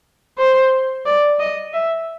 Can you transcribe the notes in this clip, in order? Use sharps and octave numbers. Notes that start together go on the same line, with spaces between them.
C5
D5
D#5
E5